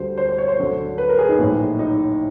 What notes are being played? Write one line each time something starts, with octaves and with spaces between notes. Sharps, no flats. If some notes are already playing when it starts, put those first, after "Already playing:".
Already playing: D2 D3 G3 C5
C5
C5
C#5
C5
D2 D3 F#3
B4
A#4
G#4
D#4
A#1 A2 F#3
D#4